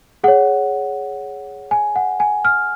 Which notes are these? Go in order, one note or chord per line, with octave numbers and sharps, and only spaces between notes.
G#4 C#5 F#5
G#5
F#5
G#5
F6